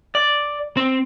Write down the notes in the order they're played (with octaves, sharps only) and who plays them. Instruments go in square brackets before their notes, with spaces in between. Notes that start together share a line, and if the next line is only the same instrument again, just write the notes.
[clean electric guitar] D5
C4